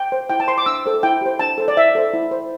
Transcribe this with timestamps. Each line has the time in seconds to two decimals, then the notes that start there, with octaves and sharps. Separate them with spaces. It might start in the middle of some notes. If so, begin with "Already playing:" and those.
Already playing: G5
0.12 C5
0.30 E4 G5
0.40 A5
0.48 C5 C6
0.58 D6
0.66 D4 E6
0.86 A4 C5
1.03 E4 G5
1.21 G4 C5
1.39 D4 A5
1.58 A4 C5
1.68 D5
1.77 E4 E5
1.95 A4 C5
2.13 E4
2.31 C5